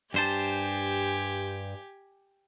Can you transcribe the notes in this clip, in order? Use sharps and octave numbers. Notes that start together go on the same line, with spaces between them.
G2 G4 C5 G#5 A5